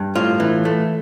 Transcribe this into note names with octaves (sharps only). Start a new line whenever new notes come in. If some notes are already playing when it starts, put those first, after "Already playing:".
Already playing: G2
A2 F4
E3
A3